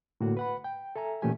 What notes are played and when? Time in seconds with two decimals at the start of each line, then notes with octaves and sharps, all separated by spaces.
0.21 A2 D3 A#3 F#4
0.37 B4 F#5 B5
0.64 G5
0.96 A4 E5 G#5 A#5
1.22 A#2 E3 A3 C#4 G4 G#5